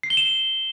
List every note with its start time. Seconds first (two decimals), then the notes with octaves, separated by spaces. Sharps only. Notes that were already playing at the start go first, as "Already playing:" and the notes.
0.03 C7
0.10 G7
0.17 E7